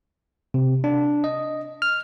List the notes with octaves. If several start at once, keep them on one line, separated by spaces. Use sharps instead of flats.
C3
D4
D#5
F6